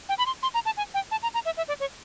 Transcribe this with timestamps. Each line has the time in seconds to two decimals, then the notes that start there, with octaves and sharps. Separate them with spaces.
0.09 G5
0.18 B5
0.26 C6
0.43 C6
0.54 A#5
0.66 A5
0.77 G#5
0.94 G5
1.11 A5
1.23 A#5
1.34 A#5
1.46 E5
1.57 E5
1.68 D5
1.80 C#5